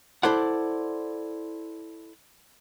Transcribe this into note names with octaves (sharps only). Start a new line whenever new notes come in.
E4 A4 C5 D5 F#5